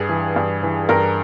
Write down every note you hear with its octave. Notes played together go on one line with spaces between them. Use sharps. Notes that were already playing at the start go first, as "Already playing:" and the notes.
Already playing: G2 G#4
E3
G2
E3
G2 A#4